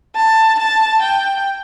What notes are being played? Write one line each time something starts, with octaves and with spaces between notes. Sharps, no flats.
A5
A5
G5